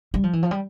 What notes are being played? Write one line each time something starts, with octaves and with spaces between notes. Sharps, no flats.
G3
F3
E3
F3
G3